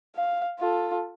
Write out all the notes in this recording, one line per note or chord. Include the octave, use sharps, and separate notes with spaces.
F5
F4 A4